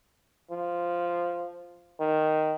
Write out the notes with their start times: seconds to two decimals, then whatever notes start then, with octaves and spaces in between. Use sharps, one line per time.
0.51 F3
2.00 D#3